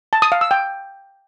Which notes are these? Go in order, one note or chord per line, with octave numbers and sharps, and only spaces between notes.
A5
D#6
F5
E6
G5